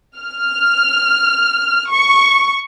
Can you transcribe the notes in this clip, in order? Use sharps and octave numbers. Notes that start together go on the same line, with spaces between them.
F6
C#6